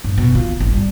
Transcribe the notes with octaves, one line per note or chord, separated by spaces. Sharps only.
G2
B2
F4
G#1
G3